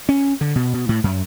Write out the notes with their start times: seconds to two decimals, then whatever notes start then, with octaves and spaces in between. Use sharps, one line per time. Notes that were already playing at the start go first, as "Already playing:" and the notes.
0.09 C#4
0.41 D3
0.56 B2
0.73 B2
0.89 A2
1.04 F#2